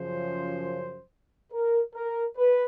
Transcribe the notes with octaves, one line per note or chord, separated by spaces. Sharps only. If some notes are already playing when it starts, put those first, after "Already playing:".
Already playing: F#2 C#3 F3 C5
A#4
A#4
B4